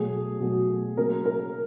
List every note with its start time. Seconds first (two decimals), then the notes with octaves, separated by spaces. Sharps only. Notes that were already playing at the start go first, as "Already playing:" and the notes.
Already playing: B2 F#3 A3 G#4
0.40 B2 F#3 A3
0.97 C#3 F#3 A#3 A#4
1.25 A#4